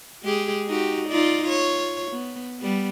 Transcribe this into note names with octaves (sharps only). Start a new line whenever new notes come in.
G#3 G4 G#4
D#4 F#4 G4
D#4 F4 D5
F4 C#5
B3
G3 B3